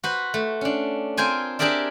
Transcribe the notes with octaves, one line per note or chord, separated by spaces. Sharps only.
F#4 B4 C5
A3
C#4 D4
C4 F4 A#4 C5 G#5
D4 G4 G#4 A#4 D5 E5